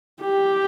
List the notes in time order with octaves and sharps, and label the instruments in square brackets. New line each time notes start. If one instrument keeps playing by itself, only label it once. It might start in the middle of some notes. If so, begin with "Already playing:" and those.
[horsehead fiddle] G4